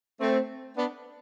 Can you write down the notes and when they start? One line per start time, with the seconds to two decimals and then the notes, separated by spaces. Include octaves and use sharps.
0.21 A3 C4
0.77 B3 D4